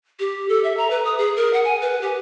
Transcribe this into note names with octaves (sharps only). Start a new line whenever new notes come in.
G4
A4
E5
A#5
B4
D#6
G#4
A#4
F#5
G#5
B4
G4